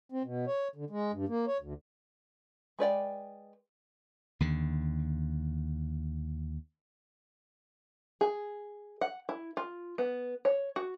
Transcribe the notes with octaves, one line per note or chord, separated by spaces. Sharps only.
C4
B2
C#5
D3
G#3
G2
A#3
C#5
D2
G#3 B4 D5 G5
D#2 D3
G#4
F#5
E4
F4
B3
C#5
F#4